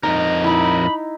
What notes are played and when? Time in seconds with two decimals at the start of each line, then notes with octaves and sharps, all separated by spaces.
0.03 F2 D#4 A#4 D#5
0.44 D#4 E4 B5